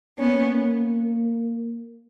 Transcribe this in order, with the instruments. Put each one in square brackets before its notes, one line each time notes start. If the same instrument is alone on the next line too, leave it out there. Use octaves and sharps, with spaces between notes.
[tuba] A#3 [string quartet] B3 C#4